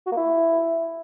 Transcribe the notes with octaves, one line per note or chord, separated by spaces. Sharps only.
F#4
A#3
E4